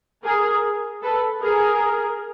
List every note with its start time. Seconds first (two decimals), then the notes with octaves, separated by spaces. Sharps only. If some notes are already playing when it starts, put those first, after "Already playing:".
0.25 G#4 A#4
1.02 A4 B4
1.41 G#4 A#4